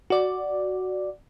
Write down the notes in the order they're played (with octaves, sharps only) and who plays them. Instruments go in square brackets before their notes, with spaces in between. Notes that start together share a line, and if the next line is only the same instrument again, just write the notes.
[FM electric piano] F#4 D5